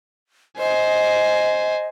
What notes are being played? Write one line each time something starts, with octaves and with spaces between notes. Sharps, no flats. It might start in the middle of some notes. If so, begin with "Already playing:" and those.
C5 D#5 G#5